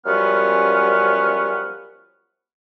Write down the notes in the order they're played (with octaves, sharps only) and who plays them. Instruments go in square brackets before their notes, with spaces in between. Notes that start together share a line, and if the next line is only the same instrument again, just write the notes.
[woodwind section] F#2 F3 G3 B3 C#4 F6